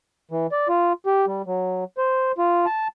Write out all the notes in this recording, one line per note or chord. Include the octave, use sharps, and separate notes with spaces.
E3
D5
F4
G4
G3
F#3
C5
F4
A5